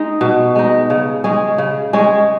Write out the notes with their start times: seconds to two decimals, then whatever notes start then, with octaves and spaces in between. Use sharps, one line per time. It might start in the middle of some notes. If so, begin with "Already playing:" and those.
Already playing: G#3 D#4
0.21 B2
0.55 G#3 D#4
0.90 C#3
1.24 G#3 C#4 G#4
1.58 C#3
1.93 G#3 C#4 G#4